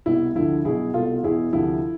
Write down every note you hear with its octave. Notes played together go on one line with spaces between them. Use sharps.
C2 B2 E4
D2 D3 F3 E4
B1 B2 E4 G#4
C2 B2 F4 A4
E2 B2 E4 G#4
D2 C3 F3 E4